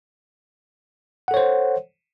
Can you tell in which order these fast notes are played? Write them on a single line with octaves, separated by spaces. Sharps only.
F#5 A4 C#5 C5